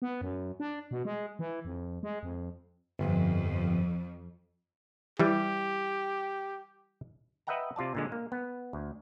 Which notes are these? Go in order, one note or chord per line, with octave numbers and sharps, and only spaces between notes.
B3
F#2
D4
B2
G#3
E3
F2
G#3
F2
G1 F2
E3 G3 G4
B4 D#5 E5 F#5 G5 A#5
C3 F4 D5 A5
A#2 D3 G#3
A#3
B3
D2